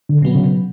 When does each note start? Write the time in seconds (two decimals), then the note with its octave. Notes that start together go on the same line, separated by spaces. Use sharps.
0.09 D3
0.22 B2 F#3 B3
0.35 C#3